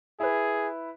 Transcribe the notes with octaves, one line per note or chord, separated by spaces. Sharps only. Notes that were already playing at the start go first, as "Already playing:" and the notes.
E4 G#4 B4